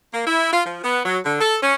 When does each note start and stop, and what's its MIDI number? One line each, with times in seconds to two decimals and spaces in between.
0.14 0.26 58
0.27 0.51 64
0.52 0.62 65
0.66 0.79 53
0.84 1.00 59
1.06 1.18 54
1.25 1.37 50
1.41 1.57 69
1.63 1.75 61